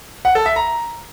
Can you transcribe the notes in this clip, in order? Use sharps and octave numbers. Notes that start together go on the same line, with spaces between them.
F#5
A4
E5
A#5